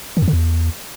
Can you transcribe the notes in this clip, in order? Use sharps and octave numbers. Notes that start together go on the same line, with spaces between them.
D#3
F2
D3
E2